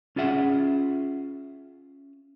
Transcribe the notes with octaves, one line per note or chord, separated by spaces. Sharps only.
C#4 F4 G#4 E5 F#5